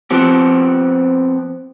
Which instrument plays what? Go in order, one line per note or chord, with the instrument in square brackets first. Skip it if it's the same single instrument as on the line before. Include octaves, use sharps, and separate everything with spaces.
[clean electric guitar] F3 B3 C4 G4